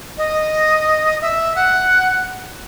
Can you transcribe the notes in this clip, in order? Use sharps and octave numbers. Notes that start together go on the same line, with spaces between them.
D#5
E5
F#5